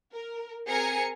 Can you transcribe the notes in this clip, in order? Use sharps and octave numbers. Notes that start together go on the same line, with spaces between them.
A#4
C4 G#4 A#4 G#5 A#5 C#7